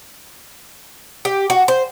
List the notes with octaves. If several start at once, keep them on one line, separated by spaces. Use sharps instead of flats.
G4
F#4
C5